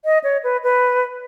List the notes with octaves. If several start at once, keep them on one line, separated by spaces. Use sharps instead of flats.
D#5
C#5
B4
B4